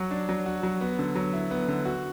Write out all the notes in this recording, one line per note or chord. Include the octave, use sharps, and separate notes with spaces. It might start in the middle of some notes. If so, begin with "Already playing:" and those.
Already playing: F#3 F#4
D4
F#3
F#4
F#3
B3
D3
F#3
E4
B3
D3
F#4